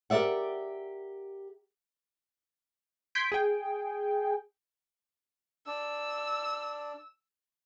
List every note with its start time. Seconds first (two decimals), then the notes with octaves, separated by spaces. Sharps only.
0.10 G4 A#4 C5 D5 E5 F#5
3.15 C6 G6 G#6 B6 D7
3.32 G#4 G5
5.67 D4 E6